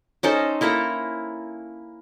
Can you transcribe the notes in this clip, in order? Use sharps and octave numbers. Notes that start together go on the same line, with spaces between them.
C#4 D#4 A4 C5
A#3 E4 A4 A#5